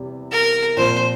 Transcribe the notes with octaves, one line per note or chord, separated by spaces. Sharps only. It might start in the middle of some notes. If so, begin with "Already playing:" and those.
Already playing: E2 C3 G3
A#4
A#2 F3 C4 C5